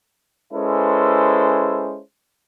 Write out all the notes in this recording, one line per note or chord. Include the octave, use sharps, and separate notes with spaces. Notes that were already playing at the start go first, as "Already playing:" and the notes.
G#3 C#4 E4 A4 B4 C5